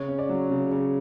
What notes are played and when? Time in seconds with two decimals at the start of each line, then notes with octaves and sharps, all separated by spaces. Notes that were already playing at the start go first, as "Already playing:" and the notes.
Already playing: C#3 C#5
0.08 C#4
0.19 D5
0.29 F#3
0.50 C#3
0.71 C#3